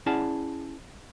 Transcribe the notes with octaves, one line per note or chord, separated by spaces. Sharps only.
C#4 E4 G#4 D5 F#5 A5